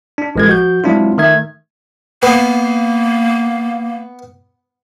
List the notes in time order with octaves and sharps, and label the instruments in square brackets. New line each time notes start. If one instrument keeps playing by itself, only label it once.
[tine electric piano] D4
A1 G#3 G#6
F3 F#4 G6
F#3 G#3 C4 D4 E4 F4
D#3 A3 E5 G#6
[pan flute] A#3 [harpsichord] B3